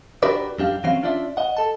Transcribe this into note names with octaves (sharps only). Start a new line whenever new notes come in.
D4 F#4 G4 A#4 B4 D5
F#2 D4 G4 F5
E3 F#3 C4 C#4 F5
C#4 D4 F4 D5 E5
D#5 F#5
A4 A5